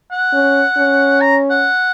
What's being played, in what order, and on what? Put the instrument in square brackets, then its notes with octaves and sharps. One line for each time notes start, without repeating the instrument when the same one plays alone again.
[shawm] F#5
[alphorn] C#4
C#4
[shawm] A#5
F#5